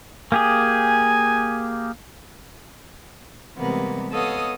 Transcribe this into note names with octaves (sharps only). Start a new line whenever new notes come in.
A#3 G4 G#4 G#5
C3 E3 G3 G#3 A#3 B3
B3 A4 C#5 D#5 F5 D#6